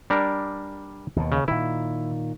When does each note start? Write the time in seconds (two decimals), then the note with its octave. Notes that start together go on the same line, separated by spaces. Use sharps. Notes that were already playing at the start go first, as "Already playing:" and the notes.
0.10 G3 D4 A#4
1.16 D#2 B2
1.32 C#3
1.48 A#2 D#3 E4